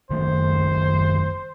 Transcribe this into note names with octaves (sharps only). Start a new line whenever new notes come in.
F#1 D#3 A3 C5